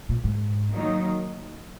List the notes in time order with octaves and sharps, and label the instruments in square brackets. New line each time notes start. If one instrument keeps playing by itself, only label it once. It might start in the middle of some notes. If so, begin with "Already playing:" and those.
[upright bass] A#2
G#2
[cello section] D#3 F#3 A#3 D#4